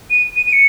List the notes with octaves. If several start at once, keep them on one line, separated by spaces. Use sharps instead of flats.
D#7
D#7
D#7
C#7